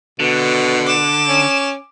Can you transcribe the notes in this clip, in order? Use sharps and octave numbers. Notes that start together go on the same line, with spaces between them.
B2 D3
D6 E7
C#4